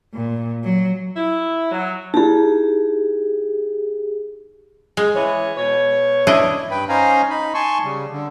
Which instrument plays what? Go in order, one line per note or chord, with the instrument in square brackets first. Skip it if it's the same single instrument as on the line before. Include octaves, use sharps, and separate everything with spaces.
[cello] A#2
F#3
[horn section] E4
F#3
[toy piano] D#4 E4 [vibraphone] G4 G#4
[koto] G#3
[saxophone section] E3 C#5
B2 C#5
[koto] D4 E4 D#5
[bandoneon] G2 B4 G5 B5
C#4 D#4 C5 F5 G#5 A#5
D#4 B5
G#5 A5 C6 C#6
C#3 G3
D3